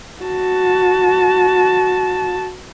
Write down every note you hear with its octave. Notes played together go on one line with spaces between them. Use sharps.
F#4 A5